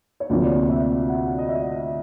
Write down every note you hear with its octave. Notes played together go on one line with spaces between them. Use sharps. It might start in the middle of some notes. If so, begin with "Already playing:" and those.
C#5
D2 C3 F3 A#3 D5
E5
F#5
D#5
E5